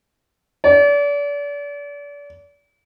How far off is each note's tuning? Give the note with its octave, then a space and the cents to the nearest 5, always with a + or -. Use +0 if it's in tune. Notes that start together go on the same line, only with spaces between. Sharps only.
D5 -35